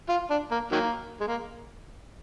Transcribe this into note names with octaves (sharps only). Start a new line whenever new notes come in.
F4
D4
A#3
D#3 F#3 A#3
G#3
A#3